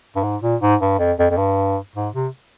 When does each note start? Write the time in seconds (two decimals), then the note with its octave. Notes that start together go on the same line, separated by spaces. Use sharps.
0.16 G2
0.23 G#2
0.42 A#2
0.62 G#2
0.81 G2
0.99 F2
1.19 F2
1.30 F2
1.37 G2
1.96 G#2
2.14 C3